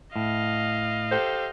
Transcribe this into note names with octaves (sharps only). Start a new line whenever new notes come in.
A2 D#5 F5
G4 A4 C5